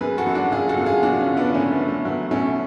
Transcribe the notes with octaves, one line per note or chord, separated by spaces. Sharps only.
F#2 G#4 B4
F#4 A4
F#2
D4 F#4
F#2 F4 G#4
F#4 A4
F#2
F4 G#4
F#2 D4 F#4
C#4 F4
D3
B3 D4
F#2 A3 C#4
B3
F#2
A3
F#3 B3
B2 A3 C#4